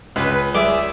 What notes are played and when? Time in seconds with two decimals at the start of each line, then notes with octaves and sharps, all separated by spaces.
0.16 C#2 B4
0.55 G#4 D5 E5